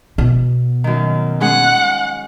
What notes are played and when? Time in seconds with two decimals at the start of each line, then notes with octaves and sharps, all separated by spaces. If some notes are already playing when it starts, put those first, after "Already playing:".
0.18 B2
0.84 F#2 D#3
1.41 G#3 C#4 G#4 F#5